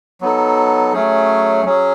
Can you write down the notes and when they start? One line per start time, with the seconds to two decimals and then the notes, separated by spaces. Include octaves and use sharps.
0.21 F#3 B3 D#4 A4
0.93 F#3 A3 C#4 G#4
1.65 F#3 C#4 G#4